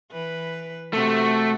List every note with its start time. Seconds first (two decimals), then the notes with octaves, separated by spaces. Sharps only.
0.11 E3 B4
0.93 C3 A3 F#4